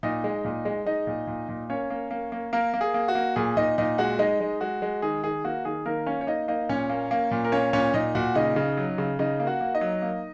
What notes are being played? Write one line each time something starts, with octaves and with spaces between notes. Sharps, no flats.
A#2 D#4 D#5
G#3
A#2
G#3
G#3 D#4 D#5
A#2
A#2
A#2
A#3 C#4 C#5
A#3
A#3
A#3
A#3 A#4
A#3
G#4
A#3
F#4
A#3
A#2 G#4
A#2 D#4 D#5
A#2 D#4 D#5
G#3 F#4 F#5
G#3 D#4 D#5
G#3
G#3 F#4
G#3
D#3 G#4
D#3 G#4
A#3 F#4
D#3 G#4
D#3 A#3 A#4
A#3 C#4 C#5
C#5
A#3 D#4 D#5
A#3 D#4 D#5
A#2 C#4 C#5
A#3
A#3
A#2
A#4
A#3 C#4 C#5
A#2 C#4 C#5
A#2 D#4 D#5
A#2 F#4 F#5
C#3 D#4 D#5
C#3
F#3
C#3
C#3 D#4 D#5
A#3
F#4 F#5
A#3
D#4 D#5
F#3
A#3